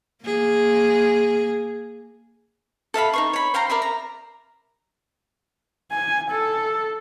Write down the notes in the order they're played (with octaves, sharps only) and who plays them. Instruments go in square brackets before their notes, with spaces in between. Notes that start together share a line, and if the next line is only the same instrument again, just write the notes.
[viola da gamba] A#3 G#4
[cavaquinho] A4 E5 F5 B5
D#4 C5 C#6
C#5 B5
C5 F5 G5 A#5
A#4 D5 E5 B5
A#5
[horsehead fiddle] G#5
A4